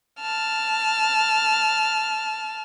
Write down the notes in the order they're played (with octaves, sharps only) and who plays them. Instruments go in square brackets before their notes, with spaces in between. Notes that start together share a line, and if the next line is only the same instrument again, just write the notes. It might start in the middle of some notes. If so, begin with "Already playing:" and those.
[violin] A5 F6